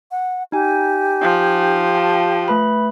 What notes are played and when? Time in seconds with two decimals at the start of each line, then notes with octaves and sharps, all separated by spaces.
0.11 F#5
0.52 D#4 G4 G#5
1.22 F3
1.95 G5 A5
2.48 A3 B4 B5